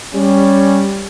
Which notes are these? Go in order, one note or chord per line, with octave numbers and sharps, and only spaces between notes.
G3 C#4